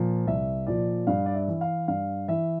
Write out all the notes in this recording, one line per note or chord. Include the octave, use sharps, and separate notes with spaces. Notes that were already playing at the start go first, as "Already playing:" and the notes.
Already playing: A#2 F3
C2 E5
A#2 F3 D5
G2 F5
D5
E5
E3
F5
G2 F5
E3 E5